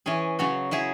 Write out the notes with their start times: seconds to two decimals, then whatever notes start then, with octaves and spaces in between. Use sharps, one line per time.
0.06 E3 C#4 G#4
0.39 C#3 F#3 C#4 F#4
0.71 F#3 E4 G#4